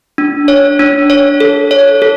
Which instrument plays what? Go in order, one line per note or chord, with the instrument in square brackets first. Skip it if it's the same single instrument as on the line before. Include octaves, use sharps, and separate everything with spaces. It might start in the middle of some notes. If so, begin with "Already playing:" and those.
[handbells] D4
C#5
D4
C#5
A4
C#5
A4